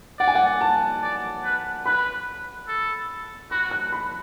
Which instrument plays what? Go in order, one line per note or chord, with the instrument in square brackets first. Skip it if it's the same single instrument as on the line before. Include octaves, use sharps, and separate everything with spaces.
[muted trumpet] D5 [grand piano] F#5
[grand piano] G#5
F#5
A5
[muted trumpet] D5
B4
[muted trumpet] B4 [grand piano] B5
[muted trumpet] A4
[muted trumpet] F#4 [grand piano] B5
[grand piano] F#6
B5